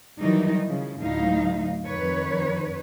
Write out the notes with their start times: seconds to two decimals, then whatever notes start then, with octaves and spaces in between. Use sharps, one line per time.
0.20 D#3 E3 F#3 G3 D#4
0.66 C#3 F3
1.00 D2 A2 F#3 D#4 F5
1.87 F2 D#3 B4 C#5